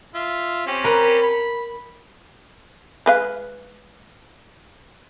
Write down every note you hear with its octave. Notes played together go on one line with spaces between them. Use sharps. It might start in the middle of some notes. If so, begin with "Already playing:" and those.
F4 E5
C4 C#4 G4
A#4 B4 A#5
B5
G#3 B4 F5